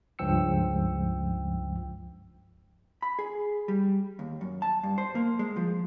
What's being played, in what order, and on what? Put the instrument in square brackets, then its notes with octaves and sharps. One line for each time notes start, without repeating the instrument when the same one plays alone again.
[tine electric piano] C#2 G2 F3 G5 E6 C#7
[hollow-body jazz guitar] B5
G#4
G3
D#2
F#2
A5
G2
C5
A#3
G#3
F3